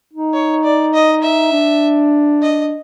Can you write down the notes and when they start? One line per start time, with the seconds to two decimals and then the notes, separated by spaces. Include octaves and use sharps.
0.14 D#4
0.33 C#5
0.64 D5
0.94 D#5
1.23 E5
1.52 D4
2.42 D#5